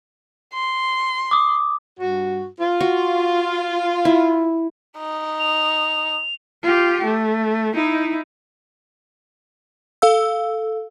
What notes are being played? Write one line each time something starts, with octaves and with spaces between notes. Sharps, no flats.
C6
D6 D#6
G2 F#4
F4
F#4
E4
D#4
F7
F4 G4
A3
D#4 E4
A4 F5 E6